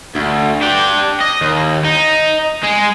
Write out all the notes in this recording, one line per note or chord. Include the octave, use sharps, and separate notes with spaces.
D2
D4 G4
D#5
D#2
D#4
G#3